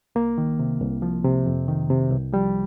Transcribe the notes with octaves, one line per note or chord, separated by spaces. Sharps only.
C2 A#3
D#3
C3
C2
F3
C3
F2
D#3
C3
C2
F3 G3